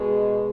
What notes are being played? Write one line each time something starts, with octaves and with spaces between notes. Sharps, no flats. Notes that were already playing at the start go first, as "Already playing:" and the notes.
Already playing: B2 G#3